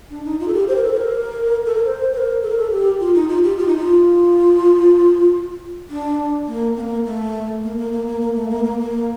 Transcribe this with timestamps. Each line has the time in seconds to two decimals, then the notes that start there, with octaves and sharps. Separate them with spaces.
0.10 D4
0.25 D#4
0.40 F4
0.48 A4
0.54 G4
0.68 C5
0.75 A#4
0.84 A4
0.92 C5
0.97 A#4
1.65 A4
1.75 A#4
1.84 C5
2.13 C5
2.17 A#4
2.42 A4
2.50 A#4
2.58 A4
2.71 G4
3.00 F4
3.15 D#4
3.28 F4
3.43 G4
3.58 F4
3.67 D#4
3.76 F4
5.90 D4
6.47 A#3
6.76 C4
6.80 A#3
7.05 A3
7.63 A#3
7.78 A#3
7.92 A#3
8.07 A#3
8.21 A#3
8.35 A3
8.50 A#3
8.64 A#3
8.80 A#3